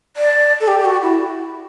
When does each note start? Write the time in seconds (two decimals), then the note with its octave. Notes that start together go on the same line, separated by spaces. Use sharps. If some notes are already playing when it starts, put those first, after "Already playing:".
0.17 D5
0.60 A4
0.68 G4
0.79 G4
0.85 F#4
1.02 E4